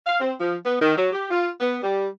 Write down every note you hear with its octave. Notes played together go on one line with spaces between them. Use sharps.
F5
C4
F3
B3
D#3
F#3
G4
F4
B3
G3